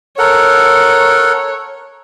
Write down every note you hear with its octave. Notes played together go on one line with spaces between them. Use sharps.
A4 A#4 C#5 F#5